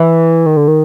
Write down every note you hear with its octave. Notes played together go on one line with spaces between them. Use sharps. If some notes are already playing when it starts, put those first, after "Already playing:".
Already playing: E3
D#3
D3
D#3